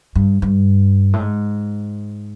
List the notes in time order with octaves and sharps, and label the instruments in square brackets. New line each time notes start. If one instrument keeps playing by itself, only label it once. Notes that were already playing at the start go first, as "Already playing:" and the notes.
[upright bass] G2
G2
A2
G#2